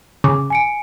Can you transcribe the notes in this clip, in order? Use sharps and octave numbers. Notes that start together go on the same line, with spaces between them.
C#3 D6
G#5 C#7 D7